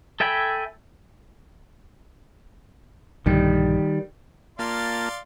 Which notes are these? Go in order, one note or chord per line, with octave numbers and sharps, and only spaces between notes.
A4 E5 G5 G#5 B5
A#1 G2 D3 D#3 G3
A#3 F4 D5 F5 A5 C6